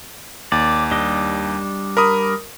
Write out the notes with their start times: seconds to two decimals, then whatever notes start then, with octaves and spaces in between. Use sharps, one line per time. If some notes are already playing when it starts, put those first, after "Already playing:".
0.52 D#2 D5
0.91 G3 D4 D#5
1.97 A#4 B5 D#6